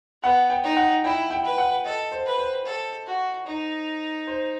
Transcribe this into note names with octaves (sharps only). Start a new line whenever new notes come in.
B3 F#5
G5
D#4
F#5
E4 G5
G5
B4
F#5
A4 D#5
C5
B4
C5
A4
F#4
D#4
C5